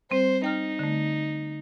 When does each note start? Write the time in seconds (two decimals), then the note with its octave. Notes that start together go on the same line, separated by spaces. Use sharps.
0.11 G3 C4 C5
0.44 D#4 G5 F6
0.79 D3 A3